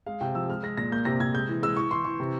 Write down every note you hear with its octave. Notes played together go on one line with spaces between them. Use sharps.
G#3 F5
C3 G5
F3 E6
G#3 F6
G#3 A#6
A#2 A#6
A#3 G6
C3 A#6
C3 G#6
G#3 G6
E3
G#3 E6
E3 C#6
E3 C6
E3 C#6
C3